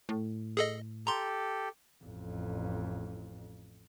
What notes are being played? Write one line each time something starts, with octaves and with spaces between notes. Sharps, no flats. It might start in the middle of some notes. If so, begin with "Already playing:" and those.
A2
G#4 A4 D#5
G4 A4 A#5 C6
A1 F2